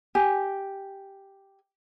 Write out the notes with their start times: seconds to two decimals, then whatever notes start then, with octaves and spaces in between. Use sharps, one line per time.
0.15 G4 G#5